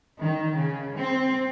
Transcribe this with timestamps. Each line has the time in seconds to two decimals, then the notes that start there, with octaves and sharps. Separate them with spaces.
0.22 D#3
0.57 C#3
0.97 C4